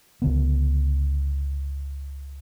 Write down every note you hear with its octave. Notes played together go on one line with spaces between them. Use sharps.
C#2 D3 B3